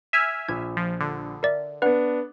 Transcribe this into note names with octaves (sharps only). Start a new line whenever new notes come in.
E5 G#5 F6
A#1 G#6
F3
D3
A#4 D5 E5
B3 D4 B4 F#5